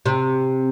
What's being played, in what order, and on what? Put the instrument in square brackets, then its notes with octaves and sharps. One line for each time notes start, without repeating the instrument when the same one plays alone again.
[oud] C3